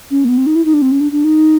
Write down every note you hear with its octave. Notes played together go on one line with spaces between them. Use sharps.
C#4
A#3
B3
C4
D#4
E4
D#4
D4
C4
C#4
D4
D4
D#4